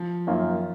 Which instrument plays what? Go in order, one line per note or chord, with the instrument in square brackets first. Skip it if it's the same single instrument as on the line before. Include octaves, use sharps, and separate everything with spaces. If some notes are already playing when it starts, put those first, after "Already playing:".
Already playing: [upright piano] F3
[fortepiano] F#2 D#3 A#3 F4